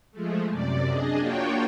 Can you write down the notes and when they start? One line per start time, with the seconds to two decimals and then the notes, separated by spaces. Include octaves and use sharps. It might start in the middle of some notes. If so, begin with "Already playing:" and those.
0.12 F3 G#3 A3
0.51 F#2 C3 D5
0.88 D4 G#4 D#5
1.19 A#3 D4 F4 F#4 C#5 G5